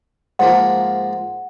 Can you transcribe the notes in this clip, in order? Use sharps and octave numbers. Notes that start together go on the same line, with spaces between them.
G#2 F3 A#3 F#5